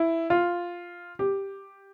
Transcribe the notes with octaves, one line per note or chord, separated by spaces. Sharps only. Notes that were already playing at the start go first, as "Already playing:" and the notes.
Already playing: E4
F4
G4